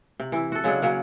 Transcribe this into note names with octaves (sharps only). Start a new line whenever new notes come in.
C3
E3 E4
F#4 A4
C#3 F#3 G#3 D4
C#3 F#3 A#3